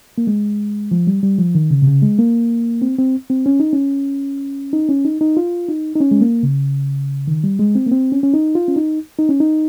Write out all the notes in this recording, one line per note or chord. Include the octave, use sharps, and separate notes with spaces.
A#3
G#3
F3
G3
G3
F3
D#3
C#3
C3
C#3
G#3
A#3
C4
C4
C4
C#4
D#4
C#4
D#4
C#4
D#4
D#4
F4
D#4
D#4
C#4
G#3
A#3
C#3
D#3
G3
G#3
C4
A#3
C4
C#4
C#4
D#4
F4
C#4
D#4
D#4
C#4
D#4